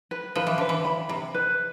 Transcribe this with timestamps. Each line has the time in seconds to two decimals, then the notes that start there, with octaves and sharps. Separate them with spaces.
0.11 B4
0.36 F3 B4
0.47 E3
0.58 D3 B4
0.69 E3
0.85 B5
1.09 C3 B5
1.34 B4